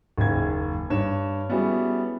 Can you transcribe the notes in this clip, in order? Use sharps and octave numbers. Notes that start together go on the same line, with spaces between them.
F#1 D#2 G#6
G2 C#5 E7
G3 B3 C#4 E4 F#4 G#4